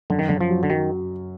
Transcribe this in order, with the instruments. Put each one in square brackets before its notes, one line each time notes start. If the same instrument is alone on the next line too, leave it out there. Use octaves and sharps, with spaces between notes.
[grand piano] F#2 [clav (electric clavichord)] D3
[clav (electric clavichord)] D#3
[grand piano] F#2 [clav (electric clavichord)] D3
[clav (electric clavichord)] F3
[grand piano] F#3
[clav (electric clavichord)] D3
[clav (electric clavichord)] D#3 [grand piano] F#3